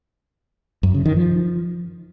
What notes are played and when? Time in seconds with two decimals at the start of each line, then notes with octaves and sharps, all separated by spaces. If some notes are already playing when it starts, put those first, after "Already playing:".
0.83 F#2
0.94 C#3
1.06 D#3
1.17 F3